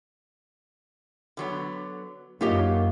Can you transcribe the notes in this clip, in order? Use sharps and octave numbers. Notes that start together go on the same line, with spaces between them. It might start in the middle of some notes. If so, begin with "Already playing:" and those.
D3 F#3 B3
F#2 F#3 A#3 D#4 F4 G4 D#5